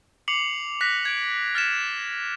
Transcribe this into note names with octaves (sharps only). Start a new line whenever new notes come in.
D6 C7 C#7 F7 F#7
F#6 A#6 B6
G#6 D7
F6 A6 B6 C#7 E7